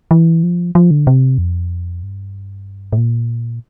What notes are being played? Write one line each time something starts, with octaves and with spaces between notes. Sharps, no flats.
E3
F3
F3
D3
C3
F2
G2
A2
A#2